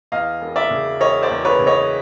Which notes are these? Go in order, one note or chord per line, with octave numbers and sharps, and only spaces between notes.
E2 D#5 F5
E1
D5 E5
C#3
E1 C#5 D#5
C5 D5
E2
B4 C#5
C#3
C#5 D#5